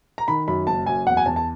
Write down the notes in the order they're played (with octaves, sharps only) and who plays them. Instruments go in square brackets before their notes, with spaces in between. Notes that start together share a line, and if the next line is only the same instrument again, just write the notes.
[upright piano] A#5
D#3 B5
F#2 B5
F#1 A5
F#2 G#5
E2 F#5
G#5
E2 A5
A5